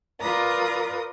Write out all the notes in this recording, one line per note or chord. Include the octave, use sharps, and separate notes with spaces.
F4 A#4 B4 D5 A#5 D#6